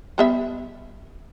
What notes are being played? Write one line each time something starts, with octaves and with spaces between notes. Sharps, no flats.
G3 B3 E5